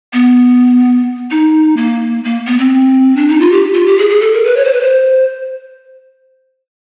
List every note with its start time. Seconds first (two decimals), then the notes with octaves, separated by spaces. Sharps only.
0.13 B3
1.31 D#4
1.77 A#3
2.24 A#3
2.47 B3
2.59 C4
3.17 D4
3.28 D#4
3.40 F4
3.52 G4
3.74 F4
3.86 G4
3.99 G#4
4.10 G#4
4.21 A4
4.33 A#4
4.45 B4
4.57 C#5
4.65 C5
4.73 B4
4.81 C5